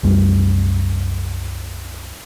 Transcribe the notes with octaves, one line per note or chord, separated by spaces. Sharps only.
C2 F#2 G3